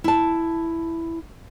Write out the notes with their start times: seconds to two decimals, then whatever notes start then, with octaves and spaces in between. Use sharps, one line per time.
0.04 E4 A5